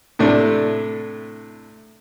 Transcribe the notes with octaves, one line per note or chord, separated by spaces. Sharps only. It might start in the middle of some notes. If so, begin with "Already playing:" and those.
A2 C3 A3 D4